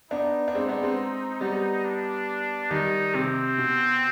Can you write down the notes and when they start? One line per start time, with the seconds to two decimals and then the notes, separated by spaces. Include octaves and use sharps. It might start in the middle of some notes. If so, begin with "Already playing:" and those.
0.11 B3 D4 D#4
0.48 D4
0.55 G#3 C4
0.68 B3 D4
0.83 G#3 C4
1.41 G3 B3
1.85 D4
2.71 D#3 G3 D#4
3.14 C3 C4
3.58 B2